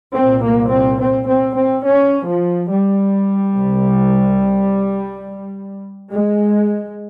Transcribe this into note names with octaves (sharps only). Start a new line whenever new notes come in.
C2 A#2 C4
A#3
C4
C4
C4
C4
C#4
F3
G3
C2 C3
G#3